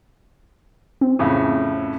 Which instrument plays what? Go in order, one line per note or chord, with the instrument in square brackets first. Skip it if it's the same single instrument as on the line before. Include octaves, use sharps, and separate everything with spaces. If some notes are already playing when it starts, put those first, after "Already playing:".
[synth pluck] C4
[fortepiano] F2 A2 C#3